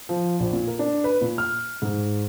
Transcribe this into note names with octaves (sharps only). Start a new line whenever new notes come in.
F3
A#1
A#2
A#4
D4
B4
A#2
F6
G#2